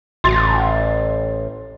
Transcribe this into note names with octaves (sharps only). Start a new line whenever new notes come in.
A1 C6 A6